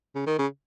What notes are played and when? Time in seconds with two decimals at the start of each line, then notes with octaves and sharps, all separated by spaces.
0.15 C#3
0.27 D#3
0.39 C#3